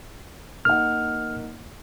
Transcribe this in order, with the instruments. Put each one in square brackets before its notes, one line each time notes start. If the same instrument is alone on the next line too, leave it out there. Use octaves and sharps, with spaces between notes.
[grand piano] A#3 D#4 F#5 [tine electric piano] F6